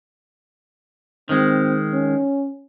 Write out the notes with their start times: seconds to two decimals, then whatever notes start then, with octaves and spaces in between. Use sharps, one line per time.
1.29 D#3 G#3 C4
1.92 C#4